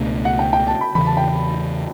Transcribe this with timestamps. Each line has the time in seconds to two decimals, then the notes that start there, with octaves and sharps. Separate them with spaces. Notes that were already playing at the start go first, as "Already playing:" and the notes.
Already playing: C#2 B2 A3 D4
0.25 F#5
0.39 G5
0.53 G5
0.67 A5
0.81 B5
0.95 E2 C#3 E3 B5
1.06 A5
1.17 G5